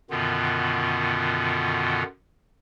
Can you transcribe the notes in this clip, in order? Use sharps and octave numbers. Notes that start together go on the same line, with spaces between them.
F#2 B2 D3 D#3 B3 F4